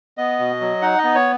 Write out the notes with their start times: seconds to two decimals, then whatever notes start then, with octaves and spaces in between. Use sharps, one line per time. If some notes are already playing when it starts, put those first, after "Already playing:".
0.17 B3 D#5
0.39 B2
0.61 F#3
0.82 D#4 F#5
0.98 D#5
1.04 B3
1.15 C#5